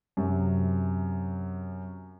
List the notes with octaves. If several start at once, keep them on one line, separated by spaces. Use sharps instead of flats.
F#2 C3